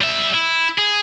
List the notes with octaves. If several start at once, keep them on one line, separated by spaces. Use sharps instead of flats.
G3 E5
E4
G#4